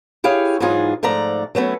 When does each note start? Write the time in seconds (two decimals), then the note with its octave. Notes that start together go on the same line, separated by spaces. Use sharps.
0.24 E4 G4 G#4 C#5 F5
0.60 G#2 E3 F#3 D#4 F4 G#4
1.03 G#2 F3 A3 D5 A#5
1.55 F#3 A3 B3 C#4